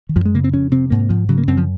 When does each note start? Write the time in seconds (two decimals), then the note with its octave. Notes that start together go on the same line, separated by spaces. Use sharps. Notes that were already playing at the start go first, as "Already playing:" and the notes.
0.09 D#3
0.16 F#2 F3
0.25 G#3
0.34 C#3 A#3
0.44 C4
0.53 F2 C#4
0.71 C3 C4
0.90 G#2 A#3
1.09 G#2 F3
1.29 C#3 F#3
1.38 A#3
1.47 F#2 C4
1.57 F3